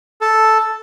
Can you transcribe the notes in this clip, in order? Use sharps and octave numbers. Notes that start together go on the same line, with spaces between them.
A4